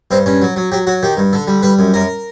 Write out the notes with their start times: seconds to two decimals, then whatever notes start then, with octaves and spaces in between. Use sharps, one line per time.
0.11 G2 C4
0.26 G2 C#4
0.42 F#3
0.56 F#3
0.72 F#3 G4
0.87 F#3 F#4
1.03 D#3 G4
1.17 G2
1.33 D3 A4
1.48 G3
1.63 G3 B4
1.79 F#2
1.94 F#2 A#4